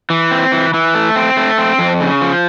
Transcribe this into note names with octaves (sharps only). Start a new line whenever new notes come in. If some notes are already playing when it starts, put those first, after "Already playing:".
E3
C4
E3
E3
A3
C4
A3
C4
F2
C#3
F3